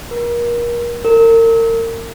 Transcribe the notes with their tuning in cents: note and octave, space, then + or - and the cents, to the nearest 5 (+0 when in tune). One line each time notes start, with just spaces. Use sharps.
A#4 +30
A#4 -35